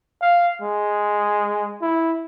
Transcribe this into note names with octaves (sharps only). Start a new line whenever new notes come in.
F5
G#3
E4